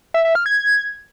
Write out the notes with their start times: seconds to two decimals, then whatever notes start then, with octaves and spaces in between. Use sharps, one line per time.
0.14 E5
0.25 E5
0.35 F6
0.46 G#6